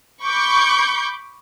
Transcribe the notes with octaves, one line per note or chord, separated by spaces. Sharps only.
B5 C#6 D6 G6